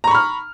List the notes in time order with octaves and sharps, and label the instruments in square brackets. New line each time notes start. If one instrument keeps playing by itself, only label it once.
[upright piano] A#5
C#6
B5
F6